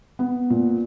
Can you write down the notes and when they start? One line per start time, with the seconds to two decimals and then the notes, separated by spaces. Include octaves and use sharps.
0.19 B3
0.50 A#2